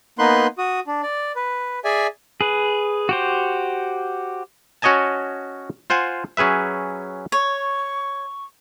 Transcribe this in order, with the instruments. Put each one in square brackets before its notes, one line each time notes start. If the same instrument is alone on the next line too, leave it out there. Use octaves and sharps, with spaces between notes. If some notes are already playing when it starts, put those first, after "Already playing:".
[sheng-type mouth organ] A#3 B3 D#4 B4 C6 F#6
F#4 D#6
D4
D5
B4
G#4 D5 E5 G#5
[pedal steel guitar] G#4 B4
F#4 G4 C5
[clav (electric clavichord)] C#4 F#4 C#5 D#5 G#5 A5
F4 C5 F#5 G#5
F#3 C#4 G#4 B4 E5
[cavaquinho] C#5 [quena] C#6